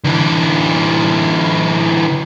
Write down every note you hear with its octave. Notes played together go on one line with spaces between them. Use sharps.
D3 E3